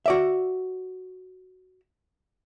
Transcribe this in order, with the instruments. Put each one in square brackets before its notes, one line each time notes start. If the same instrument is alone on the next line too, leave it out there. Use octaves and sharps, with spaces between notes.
[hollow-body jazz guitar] F#4 D5 E5